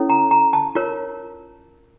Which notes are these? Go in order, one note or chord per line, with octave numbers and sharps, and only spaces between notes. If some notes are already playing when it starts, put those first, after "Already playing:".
Already playing: C#4 E4 A4 C#5
A#5
A#5
A5
F4 A#4 C#5